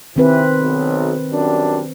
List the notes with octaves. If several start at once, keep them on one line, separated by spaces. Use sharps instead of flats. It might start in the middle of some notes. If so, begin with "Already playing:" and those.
C3 D#3 E3 C4 B4
B1
F#2 G3 D4